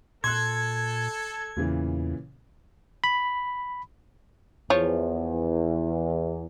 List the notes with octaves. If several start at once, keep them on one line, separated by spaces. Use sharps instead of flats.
A#2 A4 C6 F#6 G#6
E2 A#2 C#3 E3
B5
E2 F3 C#5